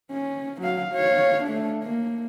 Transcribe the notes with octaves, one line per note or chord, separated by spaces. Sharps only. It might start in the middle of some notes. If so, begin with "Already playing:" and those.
C#4
F#3 F5
C#5 F5
A3 D4
A#3